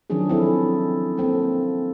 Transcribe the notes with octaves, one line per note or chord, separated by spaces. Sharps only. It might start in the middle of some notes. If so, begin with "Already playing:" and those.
D#3 F3 F#3 C#4 D4 G#4
C4 E4 A4
A#3 C4 A4